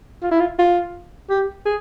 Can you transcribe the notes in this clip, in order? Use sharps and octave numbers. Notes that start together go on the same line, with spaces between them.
F4
E4
F4
F4
G4
G#4